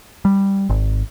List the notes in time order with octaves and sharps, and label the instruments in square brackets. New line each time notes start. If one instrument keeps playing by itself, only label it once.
[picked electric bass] G3
G#1